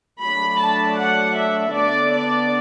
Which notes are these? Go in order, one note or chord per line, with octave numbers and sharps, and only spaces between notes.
F#3 A3 D4 B5
A5
F#5
E5
D3 B3 D4 D5
D5